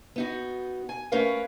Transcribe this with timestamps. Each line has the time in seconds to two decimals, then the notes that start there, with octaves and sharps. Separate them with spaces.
0.16 B3 D#4 F#4
0.89 G#5
1.12 A3 C#4 A#4 B4 C#5 F5